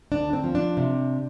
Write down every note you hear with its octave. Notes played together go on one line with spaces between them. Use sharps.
D2 D4
C4
F3
D4
C3